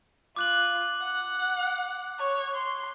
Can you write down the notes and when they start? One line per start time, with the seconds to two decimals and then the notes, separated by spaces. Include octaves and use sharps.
0.36 F4 D6 F#6 F#7
1.02 F#5
2.19 C#5
2.54 C6